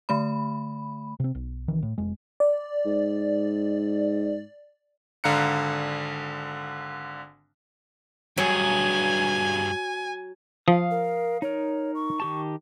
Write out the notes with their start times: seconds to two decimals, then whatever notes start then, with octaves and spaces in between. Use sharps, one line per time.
0.09 D3 A3 B5
1.20 C3 C4
1.35 B1
1.68 C2 D#3 E3
1.83 A2
1.98 F1 G#3
2.40 D5
2.86 G#2
5.24 G#1 D3 F5 A#5 F#6 C#7
8.38 G2 F#3 G#4 G#5
10.68 F3 F5 D#6
10.91 A#4
11.42 D#4 A#4 C#5
11.95 C#6
12.20 D#3 G4 A5